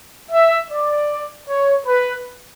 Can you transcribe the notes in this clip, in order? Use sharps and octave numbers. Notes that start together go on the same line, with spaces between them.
E5
D5
C#5
B4